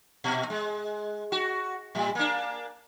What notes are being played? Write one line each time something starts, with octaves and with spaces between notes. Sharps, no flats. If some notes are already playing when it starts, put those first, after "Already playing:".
A#2
G#3
F#4
A2 G3
A#3 D4